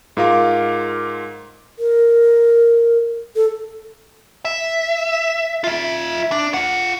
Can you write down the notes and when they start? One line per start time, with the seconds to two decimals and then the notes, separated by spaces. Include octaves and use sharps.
0.17 G#2 F4 A#4 F5 D6
1.79 A#4
3.36 A4
4.45 E5
5.64 F4 E5
6.32 D4
6.54 F4 F#5